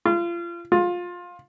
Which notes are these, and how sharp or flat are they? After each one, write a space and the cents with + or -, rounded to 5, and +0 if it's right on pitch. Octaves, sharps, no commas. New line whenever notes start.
F4 -30
F4 +20